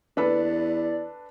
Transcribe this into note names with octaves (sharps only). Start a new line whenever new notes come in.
E2 D4 A4 B4 D5